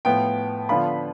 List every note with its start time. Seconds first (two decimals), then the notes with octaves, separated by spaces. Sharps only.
0.05 A2 F3 B3 G5
0.69 D3 F3 B3 F4 B5